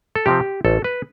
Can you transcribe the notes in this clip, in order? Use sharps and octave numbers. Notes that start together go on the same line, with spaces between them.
A4
C3 F3 C4 G4
A1 A4
B4